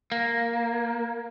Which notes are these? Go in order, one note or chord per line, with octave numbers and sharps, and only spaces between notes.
A#3